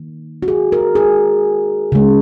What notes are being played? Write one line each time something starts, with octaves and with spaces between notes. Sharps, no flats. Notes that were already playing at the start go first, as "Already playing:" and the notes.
Already playing: D#3 A#3
F#4
G#4
A#4
G#4
C#3 G#3